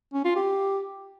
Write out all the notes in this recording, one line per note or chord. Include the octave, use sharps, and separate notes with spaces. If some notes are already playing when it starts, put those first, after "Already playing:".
C#4
F4
G4